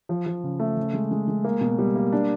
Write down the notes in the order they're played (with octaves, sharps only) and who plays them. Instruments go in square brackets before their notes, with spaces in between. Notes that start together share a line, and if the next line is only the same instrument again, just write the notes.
[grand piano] F3
F3
C#3
A3
C#3
G#3
G#3
G#3
A#3
B2
G3
A#3
D4